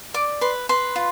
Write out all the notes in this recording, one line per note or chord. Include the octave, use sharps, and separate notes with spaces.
D5 D6
B4 C6
B4 C6
F4